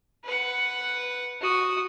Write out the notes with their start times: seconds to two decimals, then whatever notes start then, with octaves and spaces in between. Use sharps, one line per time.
0.25 B4 F#5
1.41 F#4 D#6